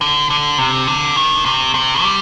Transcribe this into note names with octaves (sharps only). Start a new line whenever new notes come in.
D3
D3
C3
D3
D#3
C3
C3
G3